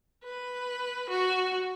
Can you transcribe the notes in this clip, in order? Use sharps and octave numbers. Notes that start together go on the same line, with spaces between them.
B4
F#4